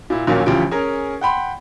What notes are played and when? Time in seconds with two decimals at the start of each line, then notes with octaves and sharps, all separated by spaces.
0.10 A#2 E4
0.27 A#1 D#2 A#2 F#3 A#3 C#4
0.46 D2 C#3 E3 F3 G4 D7
0.71 C#4 G#4 A#4
1.21 F#5 G5 B5 C6